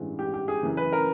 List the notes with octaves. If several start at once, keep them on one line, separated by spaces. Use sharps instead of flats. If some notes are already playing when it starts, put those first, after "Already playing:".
Already playing: A1 G2 E3 G#3
G4
G4
G#4
F#2 C#3 E3
B4
A#4